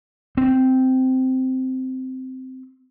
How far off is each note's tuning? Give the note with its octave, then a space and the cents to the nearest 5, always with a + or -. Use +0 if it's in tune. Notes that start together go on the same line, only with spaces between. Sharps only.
C4 -10